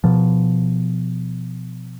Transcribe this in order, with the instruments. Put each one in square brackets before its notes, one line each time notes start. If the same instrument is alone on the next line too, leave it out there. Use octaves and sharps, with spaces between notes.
[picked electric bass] B2 F3